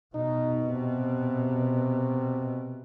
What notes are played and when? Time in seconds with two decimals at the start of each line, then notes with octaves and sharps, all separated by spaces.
0.15 B2 D#4
0.66 C3